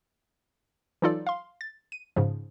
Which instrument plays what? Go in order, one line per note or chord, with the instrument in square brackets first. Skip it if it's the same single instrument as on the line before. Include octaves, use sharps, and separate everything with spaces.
[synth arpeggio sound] E3 F#3 D#4 F4 A4 D5
F5 C6
A6
D#7
G#2 C#3 F3